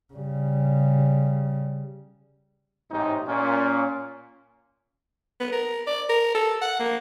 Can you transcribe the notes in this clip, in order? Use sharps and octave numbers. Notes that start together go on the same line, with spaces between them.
C#3 G3
A1 G#2 C3 D#4
A#2 C#4
B3
A#4
D5
A#4
A4
F#5
A#3